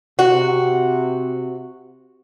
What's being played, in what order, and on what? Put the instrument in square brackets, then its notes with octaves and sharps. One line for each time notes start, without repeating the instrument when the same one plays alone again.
[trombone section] C3 [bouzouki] F#4